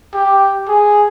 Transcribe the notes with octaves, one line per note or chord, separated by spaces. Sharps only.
G4
G#4